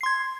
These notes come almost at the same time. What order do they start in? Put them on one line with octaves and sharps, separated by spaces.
C7 C6 G#6